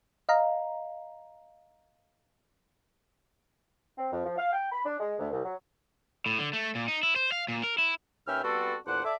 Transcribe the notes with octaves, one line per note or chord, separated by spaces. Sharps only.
D#5 F5 A#5
C4
F2
F3
F5
G5
B5
D4
G#3
D2
C2
F#3
A2
D3
A3
A#2
D#4
E4
C5
F5
A#2
A#4
E4
D#2 C#4 B4 E5 G5 F6
G3 B3 C4 F#4 A4
E2 A#2 D4 C5 F#5
A4 D5 E5 D6